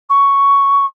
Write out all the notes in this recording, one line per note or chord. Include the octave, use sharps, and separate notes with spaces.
C#6